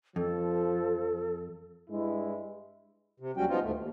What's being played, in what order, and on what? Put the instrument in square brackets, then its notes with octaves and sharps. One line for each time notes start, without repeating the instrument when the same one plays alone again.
[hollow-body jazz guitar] F2 [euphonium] F3 [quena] A4
[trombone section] G2 G#3 E4
[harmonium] C3
D#2 F#3 G3 C#4 F#4 G5
F3 B3 D#4 F4
D2 G#2 A3
D#2